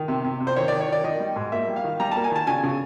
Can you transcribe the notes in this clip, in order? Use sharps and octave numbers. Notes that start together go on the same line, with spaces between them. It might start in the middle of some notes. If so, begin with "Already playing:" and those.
Already playing: D#3
C3
C3
C3
C5
D#3 C#5
D#3 D5
C#5
D#3 D5
D#3 D#5
G3
G#2
A#3 E5
G3
F5
D#3
G3 A#5
A#3 A5
G#5
D#3 A5
C#3 G#5
C#3